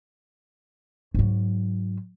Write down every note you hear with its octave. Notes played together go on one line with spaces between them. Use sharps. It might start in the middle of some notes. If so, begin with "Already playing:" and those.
G#2 F#3